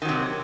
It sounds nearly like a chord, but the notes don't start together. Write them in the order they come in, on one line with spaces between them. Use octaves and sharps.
D#3 F#3 C3